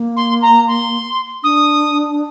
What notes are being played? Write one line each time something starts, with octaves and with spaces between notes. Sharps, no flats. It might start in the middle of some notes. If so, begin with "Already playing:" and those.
Already playing: A#3
C6
A#5
C6
D4 D#6